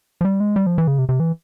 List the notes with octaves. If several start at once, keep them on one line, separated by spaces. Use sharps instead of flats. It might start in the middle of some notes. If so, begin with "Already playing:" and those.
F3
G3
G#3
G3
F3
E3
C#3
C3
C3
E3